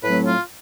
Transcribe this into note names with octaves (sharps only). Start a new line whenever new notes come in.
A2 F#3 A3 C4 B4
F4